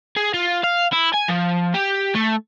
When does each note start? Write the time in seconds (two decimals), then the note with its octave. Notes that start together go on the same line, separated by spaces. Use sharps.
0.16 G#4
0.34 F4
0.64 F5
0.92 E4
1.14 G#5
1.28 F3
1.74 G4
2.15 A3